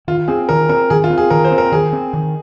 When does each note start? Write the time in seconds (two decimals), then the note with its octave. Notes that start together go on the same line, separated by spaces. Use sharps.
0.08 D#3 F4
0.28 C4 G#4
0.49 D#3 A#4
0.69 C4 A#4
0.90 D#3 G#4
1.04 F4
1.10 C4
1.18 G#4
1.30 D#3 A#4
1.45 C5
1.51 C4
1.58 A#4
1.72 D#3 G#4
1.93 C4
2.13 D#3